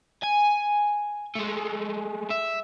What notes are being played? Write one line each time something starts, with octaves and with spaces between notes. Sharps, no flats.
G#5
G#3 A3
E5